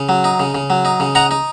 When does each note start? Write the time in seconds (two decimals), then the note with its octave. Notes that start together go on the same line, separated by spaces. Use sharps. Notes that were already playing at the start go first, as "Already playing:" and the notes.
Already playing: C#3
0.09 F#3
0.24 D#4
0.40 C#3
0.55 C#3
0.70 F#3
0.85 D#4
1.00 C#3
1.15 D#4 F#5 A#5
1.31 D#4